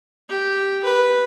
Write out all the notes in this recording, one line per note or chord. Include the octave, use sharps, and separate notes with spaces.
G4
B4